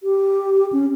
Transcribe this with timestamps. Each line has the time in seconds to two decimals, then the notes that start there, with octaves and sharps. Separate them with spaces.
0.03 G4
0.73 C#4